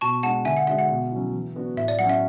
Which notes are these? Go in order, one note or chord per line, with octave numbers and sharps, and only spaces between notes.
B2 A5 C#6
G#3 D4 F#5 A5
D3 E5 G#5
F#5
G#3 D4 F#4 E5
F#5
B2
F#3 C#4 E4
E3
B3 D4 F#4
A2 E5
D5
F#3 C#4 F#5
E5